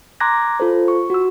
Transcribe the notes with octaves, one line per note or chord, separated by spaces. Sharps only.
A#5 C6 D6 F#6 G#6 A#6
F4 A4 C5
C#6
F#4 E6